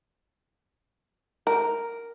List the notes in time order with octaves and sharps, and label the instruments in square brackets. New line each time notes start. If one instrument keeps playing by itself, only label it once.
[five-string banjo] A#4